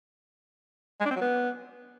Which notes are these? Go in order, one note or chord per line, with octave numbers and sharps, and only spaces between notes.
G#3
D4
C4
F#3
B3